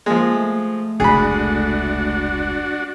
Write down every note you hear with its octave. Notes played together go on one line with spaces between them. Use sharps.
F3 G#3 A#3
A3
F1 C#2 D4 F#4 G#4 B5